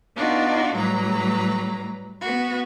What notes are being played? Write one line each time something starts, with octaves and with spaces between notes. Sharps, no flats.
B3 D4 D#4 F4 F#4
A2 F#3 G3 B4 A#5
B3 F#4